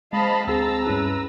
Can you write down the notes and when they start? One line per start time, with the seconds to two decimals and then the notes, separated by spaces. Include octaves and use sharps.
0.13 G#3 C5 D#5 F5 A5 B5
0.47 D2 C4 G#4 A5 A#5 E6
0.87 G2 C#4 E4 B4